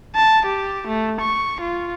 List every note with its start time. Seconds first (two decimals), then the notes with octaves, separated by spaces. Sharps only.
0.15 A5
0.46 G4
0.88 A3
1.21 C#6
1.61 F4